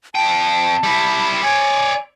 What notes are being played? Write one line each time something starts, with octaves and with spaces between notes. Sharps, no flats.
F2 G5 A5
G3 E4
C#5 D5 G#5